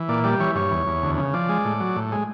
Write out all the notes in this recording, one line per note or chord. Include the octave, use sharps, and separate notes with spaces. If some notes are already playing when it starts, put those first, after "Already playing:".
Already playing: E3
A#2 D5
G3 D5
E3 C#5
G2 C#5
E2
E2
D2
C#3
F3 D5
G#3
A2
F#3
A2
G#3